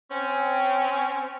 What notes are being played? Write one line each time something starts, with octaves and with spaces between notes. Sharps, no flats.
C4 C#4